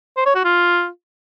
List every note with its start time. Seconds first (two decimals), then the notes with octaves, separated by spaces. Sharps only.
0.17 C5
0.26 C#5
0.35 F#4
0.44 F4